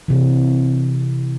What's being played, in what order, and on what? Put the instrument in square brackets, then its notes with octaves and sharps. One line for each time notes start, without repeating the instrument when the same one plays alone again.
[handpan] C3 E3